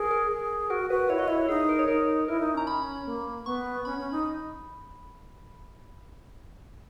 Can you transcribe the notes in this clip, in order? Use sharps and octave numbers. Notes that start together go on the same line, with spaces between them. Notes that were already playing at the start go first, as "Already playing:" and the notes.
Already playing: G#4 A#4
A#4
G#4
F#4 A#4
F#4 B4
E4 C#5
F#4 D#5
E4 C#5
D#4 G#4
A#4
C#5
D#4 A#4
E4 A#4
D#4
C#4 A#5
B5
A#3
B3 C#6
C#4 B5
C#4
D#4